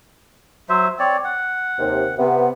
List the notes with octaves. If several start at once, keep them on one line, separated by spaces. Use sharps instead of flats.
F#3 C5 E5
C4 C#5 D5
F#5
D#2 C3
C3 B3